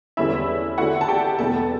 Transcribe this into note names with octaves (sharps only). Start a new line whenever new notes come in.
E2 D3 G3 C#4 E4 E5
D3 A3 E4 F#4 F#5
A5
G4 G5
E2 B2 G3 B3 A4 A5